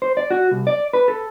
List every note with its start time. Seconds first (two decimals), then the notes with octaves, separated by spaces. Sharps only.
0.02 C5
0.17 D5
0.31 F#4
0.51 C2
0.67 D5
0.93 B4
1.08 A4